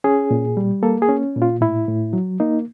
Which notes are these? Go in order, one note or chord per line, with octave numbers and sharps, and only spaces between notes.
C#4 G#4
A#2
G3
A#3 A4
G#4
C#4
A#2
F4
A2 E4
A2
F#3
A#3 D#4